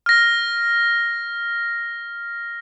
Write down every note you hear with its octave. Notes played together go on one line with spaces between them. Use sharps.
F6 A#6